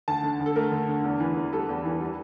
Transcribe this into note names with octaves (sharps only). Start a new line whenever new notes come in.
D2 A5
D3
D2
A4
A3 A#4
D2
D3
E2
E3
E2
G3 A4
E2
E3
G3